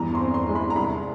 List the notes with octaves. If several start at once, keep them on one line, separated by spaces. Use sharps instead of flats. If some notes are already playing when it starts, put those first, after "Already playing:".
Already playing: E2 G2 A#5
C6
C4
C6
G#3
B5
A#5
C2 B5